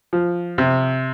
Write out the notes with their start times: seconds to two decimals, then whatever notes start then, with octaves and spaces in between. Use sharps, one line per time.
0.13 F3
0.58 C3